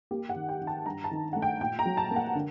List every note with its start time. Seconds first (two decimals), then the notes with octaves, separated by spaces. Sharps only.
0.11 A#3 G4
0.29 F#5
0.36 D#3
0.49 G5
0.61 D#3
0.67 A5
0.86 G2 A#5
1.04 A5
1.11 D#3
1.33 A3 F#5
1.42 G5
1.60 A#2 G5
1.79 A#5
1.86 F#3
1.97 A5
2.11 A#3
2.16 F#5
2.35 D3